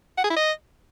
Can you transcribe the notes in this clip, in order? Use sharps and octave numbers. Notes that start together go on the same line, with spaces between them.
F#5
G#4
E4
D#5